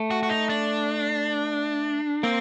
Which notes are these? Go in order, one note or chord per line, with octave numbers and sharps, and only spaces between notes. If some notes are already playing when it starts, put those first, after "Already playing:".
Already playing: A3
F#4
F#4
D#4
D4
A#3 C4